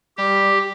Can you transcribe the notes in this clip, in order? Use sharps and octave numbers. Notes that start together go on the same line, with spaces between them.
G3 G4